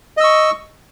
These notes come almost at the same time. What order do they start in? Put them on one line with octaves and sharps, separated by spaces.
D#5 E6 C#6